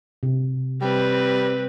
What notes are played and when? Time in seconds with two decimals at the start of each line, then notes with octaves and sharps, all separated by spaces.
0.23 C3
0.82 G3 C4 B4